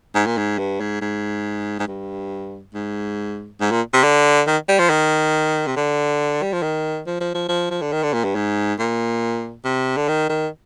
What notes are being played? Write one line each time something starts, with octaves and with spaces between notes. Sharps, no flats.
G#2
A#2
G#2
G2
G#2
G#2
G#2
G2
G#2
G#2
A#2
C3
D3
D#3
G3
F3
D#3
C3
D3
G3
F3
D#3
F3
F3
F3
F3
F3
D3
D#3
D3
A#2
G2
G#2
A#2
C3
D3
D#3
D#3